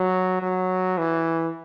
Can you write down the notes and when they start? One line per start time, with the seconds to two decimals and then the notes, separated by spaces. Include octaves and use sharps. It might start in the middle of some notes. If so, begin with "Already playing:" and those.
Already playing: F#3
0.42 F#3
0.98 E3